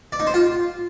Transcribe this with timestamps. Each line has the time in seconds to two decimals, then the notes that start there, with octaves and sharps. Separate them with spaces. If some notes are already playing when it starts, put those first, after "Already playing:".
0.12 D5
0.20 D#4
0.27 C5
0.34 F4